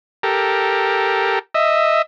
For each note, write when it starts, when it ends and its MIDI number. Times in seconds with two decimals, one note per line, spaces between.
0.23 1.39 67
0.23 1.39 69
0.23 1.39 70
1.55 2.02 75
1.55 2.02 76